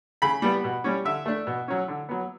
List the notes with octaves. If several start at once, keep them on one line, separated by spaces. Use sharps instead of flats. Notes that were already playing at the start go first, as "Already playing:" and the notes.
C#3 B5
G3 B3
B2
G3 C#4
D3 E5
A3 D4
B2
F#3 C#4
D3
F#3 B3